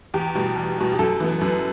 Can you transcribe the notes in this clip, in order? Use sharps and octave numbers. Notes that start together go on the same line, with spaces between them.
E2 G4
B2 G3
E2
B2 G3
G4
F#2 A4
E3 B3
F#2